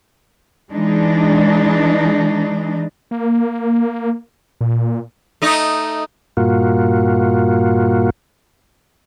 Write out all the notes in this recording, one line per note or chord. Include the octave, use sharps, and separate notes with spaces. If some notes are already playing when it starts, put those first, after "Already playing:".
E3 G#3 D4 D#4
A#3
A#2
A3 D#4 D#5
G2 A#2 A#3 F4 F#4